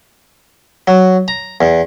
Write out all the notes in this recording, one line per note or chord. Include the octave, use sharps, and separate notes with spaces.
F#3
A#5
E2